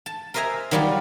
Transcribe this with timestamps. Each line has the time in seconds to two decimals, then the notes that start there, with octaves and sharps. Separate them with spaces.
0.06 A5
0.34 A#4 C5 D#5 E5 G#5 A#5
0.71 D#3 F#3 G3 F4 G4